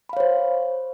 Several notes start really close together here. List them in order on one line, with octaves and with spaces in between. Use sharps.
B5 F5 C#5 C5